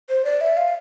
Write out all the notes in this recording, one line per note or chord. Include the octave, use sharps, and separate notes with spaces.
C5
D5
E5
F5